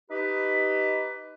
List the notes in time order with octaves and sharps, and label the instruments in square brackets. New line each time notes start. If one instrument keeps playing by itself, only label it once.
[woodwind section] D#4 G4 B4